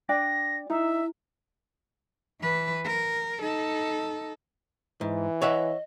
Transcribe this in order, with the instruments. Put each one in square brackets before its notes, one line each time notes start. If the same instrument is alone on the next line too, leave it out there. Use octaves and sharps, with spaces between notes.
[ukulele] D4 D5 G5 [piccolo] A#6
[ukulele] D#4 A#5 [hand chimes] E4 [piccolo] E5
[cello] E3 B4
A#4
D#4 A4
[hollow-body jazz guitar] G#2 [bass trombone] E3
[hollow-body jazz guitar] C#5 E5 F#5 [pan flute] D#5